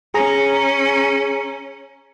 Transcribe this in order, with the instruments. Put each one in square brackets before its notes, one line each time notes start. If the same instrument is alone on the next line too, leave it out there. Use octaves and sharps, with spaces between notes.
[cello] C#4 [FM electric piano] G#4 A#5